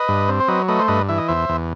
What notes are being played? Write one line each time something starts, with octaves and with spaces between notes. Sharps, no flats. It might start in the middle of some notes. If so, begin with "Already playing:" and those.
Already playing: B4 D#5
G2
C4
C5
F#3 B4 D#5
A3 B4 D#5
C5
G2 B4 D#5
E3 E5
D#5
E2 C5 E5
E2